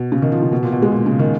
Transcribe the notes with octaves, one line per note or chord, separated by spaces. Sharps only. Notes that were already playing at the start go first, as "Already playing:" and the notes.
Already playing: B2
C#3
D#3
F3
C#3
B2
A#2
B2
G#3
A#2
C#3
D#3